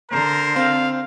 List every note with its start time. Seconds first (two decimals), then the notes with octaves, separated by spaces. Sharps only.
0.11 D3 A#4 C5 A#5
0.56 C4 F5